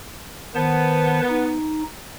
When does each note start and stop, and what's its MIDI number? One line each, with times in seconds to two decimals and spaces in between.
0.55 1.21 51
0.55 1.54 59
0.55 1.21 72
0.55 1.21 81
1.29 1.83 63